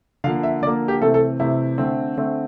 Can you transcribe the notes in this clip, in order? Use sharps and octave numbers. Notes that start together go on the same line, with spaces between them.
D3 F3 A#3 F5
E5
D3 F3 A#3 D5
G4
C3 E3 A3 C4 A4
A4
C3 E3 A3 C4 E4
D3 A3 C4
D3 A3 C4